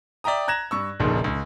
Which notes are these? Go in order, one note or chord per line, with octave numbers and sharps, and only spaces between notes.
D5 E5 G5 A#5 D#6
A#5 F#6 G#6 A#6 E7
G2 C#6 E6
F1 A#1 D#2 A#2 C#3
C#2